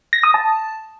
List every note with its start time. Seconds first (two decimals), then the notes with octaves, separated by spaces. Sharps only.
0.13 A#6
0.23 D#6
0.34 A5